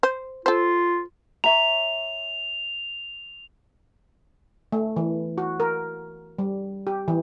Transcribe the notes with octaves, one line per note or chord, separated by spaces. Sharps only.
C5
F4 A4 C5
C#5 E5 A#5 F7
A3
E3
F#4
A#4
G3
G4
E3